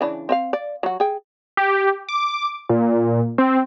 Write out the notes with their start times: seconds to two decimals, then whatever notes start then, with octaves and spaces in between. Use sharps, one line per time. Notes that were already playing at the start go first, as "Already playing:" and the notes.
0.01 C#3 E3 D4
0.29 C4 E5 F5
0.53 D5
0.83 F#3 F#4
1.00 G#4 G5
1.57 G4
2.09 D6
2.69 A#2
3.38 C4